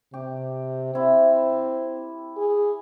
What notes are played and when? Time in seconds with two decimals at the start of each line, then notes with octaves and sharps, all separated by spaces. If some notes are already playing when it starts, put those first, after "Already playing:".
0.14 C3 G4
0.95 C4 E4
2.37 G#4